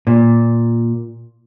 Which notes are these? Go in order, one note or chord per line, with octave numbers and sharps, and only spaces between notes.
A#2